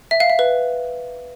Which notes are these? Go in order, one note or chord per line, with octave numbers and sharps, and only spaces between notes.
E5
F5
E5
B4